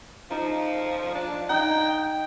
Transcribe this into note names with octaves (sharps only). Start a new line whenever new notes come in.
F3 D#4
D4
D#4 G5